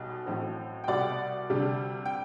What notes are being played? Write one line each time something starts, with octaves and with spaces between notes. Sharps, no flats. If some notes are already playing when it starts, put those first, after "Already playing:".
Already playing: B1 B2 G3
A1 A2 F#3 A3 C4
G5
C2 B2 G3 D5 F#5
D2 C3 G3 D4
G5